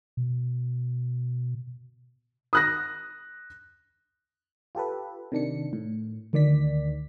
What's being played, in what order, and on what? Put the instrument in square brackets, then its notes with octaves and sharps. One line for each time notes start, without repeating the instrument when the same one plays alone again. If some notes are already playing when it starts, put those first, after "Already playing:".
[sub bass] B2
[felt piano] D#6 F#6 A#6
[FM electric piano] F4 G4 A4 B4
C3 D#3 D4 C#7
A2
D2 D#3 D5 B6